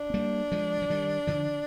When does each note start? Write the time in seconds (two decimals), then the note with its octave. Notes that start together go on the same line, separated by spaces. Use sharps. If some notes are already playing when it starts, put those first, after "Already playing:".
Already playing: D4
0.10 C4
0.14 G3 A#3
0.52 F3 G#3
0.82 F3
0.90 D#3 G3
1.27 D3 F3